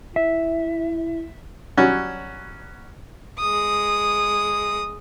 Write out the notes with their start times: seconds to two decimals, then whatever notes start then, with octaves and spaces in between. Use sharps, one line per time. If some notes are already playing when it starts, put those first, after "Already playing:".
0.16 E4 E5
1.77 F#3 G3 C#4 F#4
3.39 G#3 D#6